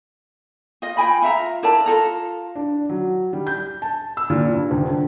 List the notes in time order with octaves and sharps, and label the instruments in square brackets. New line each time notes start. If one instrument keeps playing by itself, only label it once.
[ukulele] F4 D#5
F4 G5 G#5 B5
F4 E5 F#5 A#5
E4 A#4 D5 A5
F4 A4 A#5
[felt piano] D4
F#3
G3
G6
A5
E6
A#2
G2
D#1
D3